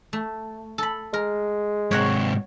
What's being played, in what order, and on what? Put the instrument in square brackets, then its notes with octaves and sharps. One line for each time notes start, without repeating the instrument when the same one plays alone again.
[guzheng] A3
A4 B5
[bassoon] G#3 [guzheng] A#4
[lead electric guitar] G#2 C3 [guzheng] C#5 F#5 A#5